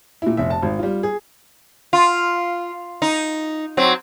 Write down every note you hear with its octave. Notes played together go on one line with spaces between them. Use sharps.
A#2 E4
F1 E5
A5
G#1
G3 F4
G#4
F4
D#4
F#3 C4